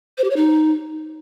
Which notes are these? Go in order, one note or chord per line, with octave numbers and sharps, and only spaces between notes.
C5
G4
C#5
D#4